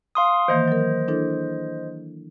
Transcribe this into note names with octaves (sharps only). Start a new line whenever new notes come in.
F5 C6 D#6
D#3 E3 A#3 C5 D#5
F#3 A#4
D4 E4 A4